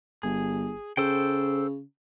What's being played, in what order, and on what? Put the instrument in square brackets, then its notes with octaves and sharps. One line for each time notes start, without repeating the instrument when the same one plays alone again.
[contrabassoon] G1 [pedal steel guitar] G#4
[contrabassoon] C#3 [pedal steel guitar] A4 C5 G5